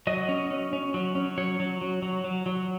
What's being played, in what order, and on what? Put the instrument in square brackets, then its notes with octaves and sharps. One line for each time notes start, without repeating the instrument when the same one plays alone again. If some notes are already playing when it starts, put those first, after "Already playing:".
[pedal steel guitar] F#3 D#5
C#4
C#4
C#4
F#3
C#4
F#3 C#5
F#3
F#3
F#3
F#3
F#3